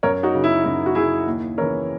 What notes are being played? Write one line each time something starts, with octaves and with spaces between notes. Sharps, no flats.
F#2 A#4 C#5
D#4 F#4
C#3 F#3
E4
F#2 E4
F#4
C#3 F#3 E4 G#4
D#2
C#3 E3 A#4 C#5